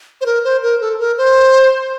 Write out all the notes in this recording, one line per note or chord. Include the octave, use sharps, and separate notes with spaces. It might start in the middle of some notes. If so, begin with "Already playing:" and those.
C5
A#4
C5
A#4
A4
A#4
C5